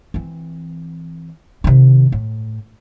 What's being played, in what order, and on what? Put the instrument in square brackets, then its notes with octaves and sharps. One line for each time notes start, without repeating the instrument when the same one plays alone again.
[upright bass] E3 C4
C3 D#3
A2